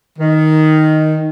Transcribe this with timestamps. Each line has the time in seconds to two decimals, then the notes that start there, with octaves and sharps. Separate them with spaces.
0.19 D#3